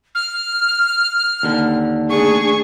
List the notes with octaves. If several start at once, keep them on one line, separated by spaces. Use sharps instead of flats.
F6
D#2 D3
A3 D4 G#4 C#6